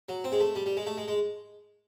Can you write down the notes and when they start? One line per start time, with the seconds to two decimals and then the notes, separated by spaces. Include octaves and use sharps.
0.09 F#3
0.24 C4
0.32 G#3
0.40 A3
0.55 G3
0.66 G3
0.77 G#3
0.86 A3
0.97 G#3
1.08 G#3